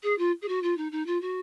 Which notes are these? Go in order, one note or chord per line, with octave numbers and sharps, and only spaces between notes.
G#4
F4
G#4
F#4
F4
D#4
D#4
F4
F#4